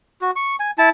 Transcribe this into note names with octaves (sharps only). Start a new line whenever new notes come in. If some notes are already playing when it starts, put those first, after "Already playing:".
F#4
C#6
G#5
E4 A5